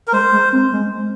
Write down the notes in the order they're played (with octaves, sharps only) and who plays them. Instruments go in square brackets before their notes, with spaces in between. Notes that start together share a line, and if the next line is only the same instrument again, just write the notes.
[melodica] A#4
[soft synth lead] G#3 [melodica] C5
[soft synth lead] G#3
C4
G#3